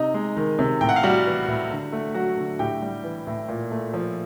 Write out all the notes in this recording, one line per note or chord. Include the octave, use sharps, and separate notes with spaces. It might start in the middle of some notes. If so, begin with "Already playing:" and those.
Already playing: C3 D#4 D#5
G#3
D#3
C3
A2 G5
F#5
F5
G3 F#4 F#5
E3
A2
D3
A3
F#3 F#4 F#5
D3
A2 G4 G5
G3
E3
A2
A#2
A3
F3